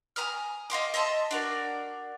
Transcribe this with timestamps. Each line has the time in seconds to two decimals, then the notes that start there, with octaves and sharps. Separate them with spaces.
0.16 G#5 A#5 D#6 F6
0.70 D#5 F5 C6 D6
0.94 D#5 E5 A5 C6
1.31 D4 F#4 A#4